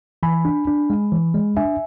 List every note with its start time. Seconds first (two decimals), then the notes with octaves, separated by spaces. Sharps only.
0.23 E3 G#5 B5
0.45 D4
0.67 D4
0.90 G#3
1.12 E3
1.34 G#3
1.57 D4 E5 G#5